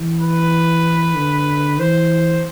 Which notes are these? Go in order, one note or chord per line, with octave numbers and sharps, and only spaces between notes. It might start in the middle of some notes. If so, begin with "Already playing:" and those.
Already playing: E3
B4
D3
E3 C5